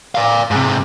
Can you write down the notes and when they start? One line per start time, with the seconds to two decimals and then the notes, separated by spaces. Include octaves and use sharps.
0.15 D5 F5
0.51 G#2 C3